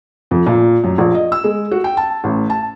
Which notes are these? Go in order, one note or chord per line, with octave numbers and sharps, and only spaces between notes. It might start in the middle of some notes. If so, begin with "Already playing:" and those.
F2
A#2
F#2
A#1
D#5
E6
G#3
F#4
G5
A5
A1
A5